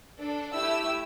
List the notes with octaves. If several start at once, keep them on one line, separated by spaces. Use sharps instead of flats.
D4 A4
A3 E4 G4 E6